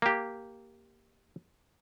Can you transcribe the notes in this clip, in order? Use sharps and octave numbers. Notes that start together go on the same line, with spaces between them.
A#3 G4